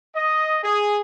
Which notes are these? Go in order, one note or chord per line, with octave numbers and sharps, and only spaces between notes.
D#5
G#4